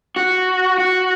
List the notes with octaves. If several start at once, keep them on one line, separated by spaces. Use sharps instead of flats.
F#4
F#4